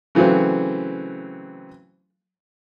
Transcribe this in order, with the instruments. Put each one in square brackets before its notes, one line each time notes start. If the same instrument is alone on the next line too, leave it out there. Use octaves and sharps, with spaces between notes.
[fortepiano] C#3 E3 F#3 A3 C4